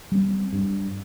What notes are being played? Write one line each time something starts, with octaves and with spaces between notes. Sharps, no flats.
G3 C4
G2